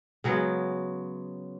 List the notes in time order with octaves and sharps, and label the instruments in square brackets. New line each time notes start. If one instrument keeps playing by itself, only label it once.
[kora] C#3 F#3 G#3 B3